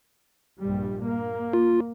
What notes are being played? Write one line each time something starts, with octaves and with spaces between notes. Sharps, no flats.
A#1 G2 G3
A#3
F4